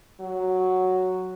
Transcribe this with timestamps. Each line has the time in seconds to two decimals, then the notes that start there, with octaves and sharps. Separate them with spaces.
0.21 F#3